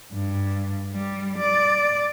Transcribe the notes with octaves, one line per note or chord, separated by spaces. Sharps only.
G2
G3
D5